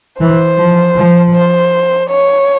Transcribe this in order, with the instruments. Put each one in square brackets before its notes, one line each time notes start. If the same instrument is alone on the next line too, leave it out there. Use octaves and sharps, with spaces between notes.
[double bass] E3 [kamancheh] C5
[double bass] F3
F3
[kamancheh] C5
C#5